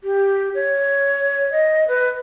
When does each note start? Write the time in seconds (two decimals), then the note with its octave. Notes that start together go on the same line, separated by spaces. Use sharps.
0.04 G4
0.55 C#5
1.52 D#5
1.88 B4